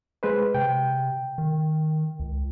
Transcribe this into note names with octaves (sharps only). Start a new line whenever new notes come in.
G#3 B4 C5
C3 G5
D#3
C#2